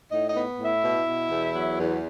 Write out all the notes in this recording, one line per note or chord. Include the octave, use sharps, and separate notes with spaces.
A2 D#4 D#5
D#4 D#5
B3
A2
E4 E5
B2
B2
E2
F#3
E2